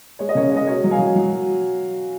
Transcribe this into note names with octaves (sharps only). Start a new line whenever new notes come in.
G#3 C#5
D#5
C#3 A#4 C#5
G#3 D#5
B2 A#4 C#5
F#3
F5 G#5
F#3
F#3